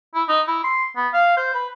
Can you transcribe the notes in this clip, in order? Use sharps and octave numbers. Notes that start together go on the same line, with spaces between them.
E4
D#4
E4
C6
B3
F5
C5
B4